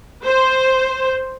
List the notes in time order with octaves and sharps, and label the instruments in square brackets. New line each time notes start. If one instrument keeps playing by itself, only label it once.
[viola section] C5